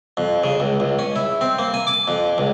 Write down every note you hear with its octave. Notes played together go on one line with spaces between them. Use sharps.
F2
C#3
C#2
C#2
C#4
E4
C4
A#3
G#5
D6
F2
C#2